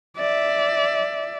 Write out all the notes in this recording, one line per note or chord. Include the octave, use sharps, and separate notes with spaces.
D5 E5